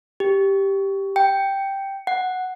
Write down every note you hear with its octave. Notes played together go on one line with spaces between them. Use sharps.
G4
G5
F#5